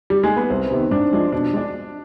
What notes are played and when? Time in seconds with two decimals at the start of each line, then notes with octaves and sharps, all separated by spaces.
0.10 G3
0.24 G#3
0.36 B3
0.50 C2 C4
0.71 C3 D#3 B3
0.91 G#2 D4
1.12 F3 G#3 D4 F4
1.32 B2 D4
1.53 G#3 D4